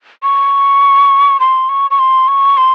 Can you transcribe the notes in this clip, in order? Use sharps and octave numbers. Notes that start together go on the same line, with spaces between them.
C#6
C6
C#6
C#6
C6
C#6
C6